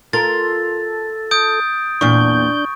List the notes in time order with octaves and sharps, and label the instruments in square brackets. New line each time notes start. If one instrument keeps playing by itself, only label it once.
[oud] F4 A#4 [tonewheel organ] A4 [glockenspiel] A6
[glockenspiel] D#6 G6 D7
[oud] E2 A#2 [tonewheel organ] D4 G6 [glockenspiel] C#6